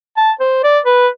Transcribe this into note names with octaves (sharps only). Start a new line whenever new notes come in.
A5
C5
D5
B4